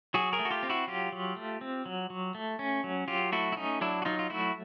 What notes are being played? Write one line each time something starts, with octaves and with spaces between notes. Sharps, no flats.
F#3 F#4 G#4
G#4 A#4
A3
F#4
F4 G4
C4
E4 F#4
F#3 F4 G4
F#3
A3
C4
F#3
F#3
A3
C#4
F#3
F#3 F4 G4
A3 E4 F#4
E4
C#4 D#4
F#3 D4 E4
F#4
F#3 D#4 F4
F4
A3 E4 F#4